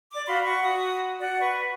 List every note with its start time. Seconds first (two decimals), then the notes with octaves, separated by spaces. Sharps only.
0.12 D5 D6
0.27 F#4 F5 B5 C6
0.42 F#5 B5 C#6
0.63 F#4 D#6
1.19 F#4 D5 F#5
1.41 B4 C#6